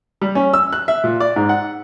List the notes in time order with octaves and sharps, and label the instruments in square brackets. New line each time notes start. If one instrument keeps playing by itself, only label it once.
[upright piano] G3
C#4
E6
F#6
E5
A#2
D5
G#2
F#5